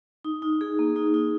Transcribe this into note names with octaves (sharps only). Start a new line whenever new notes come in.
D#4
D#4
G#4
A#3
D#4
D#4